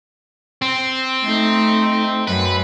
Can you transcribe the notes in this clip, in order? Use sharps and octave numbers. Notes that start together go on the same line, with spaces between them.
C4
A3 D#4
F#2 B4